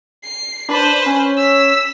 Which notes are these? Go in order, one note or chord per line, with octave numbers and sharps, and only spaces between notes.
C7
D4 B4 C5
C#4
E6 B6